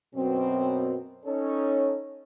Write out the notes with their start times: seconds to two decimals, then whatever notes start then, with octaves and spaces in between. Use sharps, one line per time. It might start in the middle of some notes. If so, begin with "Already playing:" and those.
0.15 F#2 B2 C4
1.26 C#4 D#4 A4 C#5